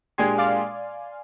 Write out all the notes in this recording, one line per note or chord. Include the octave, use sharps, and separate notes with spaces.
A#2 G#3 D4 G4 G#5 C6
D5 F5